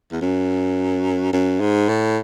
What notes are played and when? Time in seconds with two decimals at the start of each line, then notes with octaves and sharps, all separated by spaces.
0.12 E2
0.21 F#2
1.33 F#2
1.61 G#2
1.89 A2